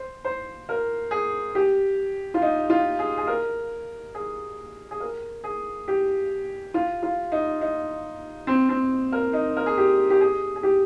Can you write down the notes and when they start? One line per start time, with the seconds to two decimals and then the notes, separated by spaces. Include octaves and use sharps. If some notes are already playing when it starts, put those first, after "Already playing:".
Already playing: C5
0.25 C5
0.69 A#4
1.11 G#4
1.55 G4
2.34 F4
2.42 D#4
2.70 F4
2.99 G#4
3.18 G#4
3.27 A#4
4.15 G#4
4.91 G#4
5.00 A#4
5.44 G#4
5.88 G4
6.74 F4
7.03 F4
7.32 D#4
7.61 D#4
8.47 C4
8.69 C4
9.12 A#4
9.33 D#4
9.57 A#4
9.66 G#4
9.78 G4
10.10 G4
10.21 G#4
10.56 G#4
10.63 G4